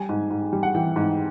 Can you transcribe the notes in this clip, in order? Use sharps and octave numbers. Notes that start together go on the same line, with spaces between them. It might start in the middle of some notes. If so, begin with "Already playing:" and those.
Already playing: G3 G#5
G#2
G#2
G3
F#5
E3 G5
G#2